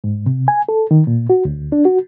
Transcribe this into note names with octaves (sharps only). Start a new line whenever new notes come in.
G#2
C3
G#5
A4
D#3
A#2
F#4
D2
D4
F#4